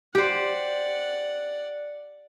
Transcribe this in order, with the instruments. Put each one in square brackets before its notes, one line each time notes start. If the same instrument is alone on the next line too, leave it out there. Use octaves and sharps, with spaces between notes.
[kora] G4 C5 [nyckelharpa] D5 F#5